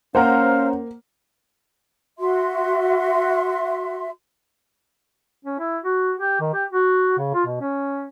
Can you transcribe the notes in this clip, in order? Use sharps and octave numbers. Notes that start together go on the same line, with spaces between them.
A#3 C#4 C5 F5 F#5 A#5
F#4 E5 C6
C#4
E4
F#4
G4
D#3
G4
F#4
C#3
F4
B2
C#4